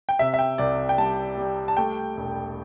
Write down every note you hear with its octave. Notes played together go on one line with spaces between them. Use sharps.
G5
C3 E5
E5
G5
C2 D5
G5
G3 A5
G3
A5
A3 G5
E1